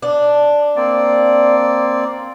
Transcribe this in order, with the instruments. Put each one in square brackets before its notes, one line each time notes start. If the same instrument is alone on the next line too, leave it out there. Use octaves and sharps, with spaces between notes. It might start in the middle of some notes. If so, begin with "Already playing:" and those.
[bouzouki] D4
[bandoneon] A#3 C4 D5